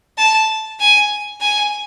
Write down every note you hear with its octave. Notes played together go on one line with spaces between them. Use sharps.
A5
G#5
G#5